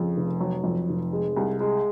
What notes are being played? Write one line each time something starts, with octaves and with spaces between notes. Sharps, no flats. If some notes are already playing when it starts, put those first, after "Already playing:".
Already playing: F2 C#3
F1
F#3
F2
F1
G#3
C2
G#3